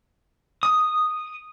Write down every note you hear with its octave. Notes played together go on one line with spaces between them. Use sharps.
D#6